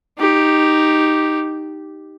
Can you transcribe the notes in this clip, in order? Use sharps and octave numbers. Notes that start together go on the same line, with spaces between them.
D#4 G4